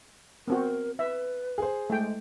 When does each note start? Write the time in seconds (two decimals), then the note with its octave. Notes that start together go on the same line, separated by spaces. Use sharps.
0.48 B3 C4 F#4 A#4
0.99 B4 E5
1.58 G#4 C5
1.90 G#3 A3 G5